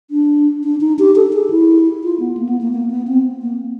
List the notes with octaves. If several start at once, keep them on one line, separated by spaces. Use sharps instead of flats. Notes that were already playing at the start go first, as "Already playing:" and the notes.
D4
D4
D#4
G4
A4
G#4
E4
F4
B3
A#3
B3
A#3
A#3
B3
C4
A#3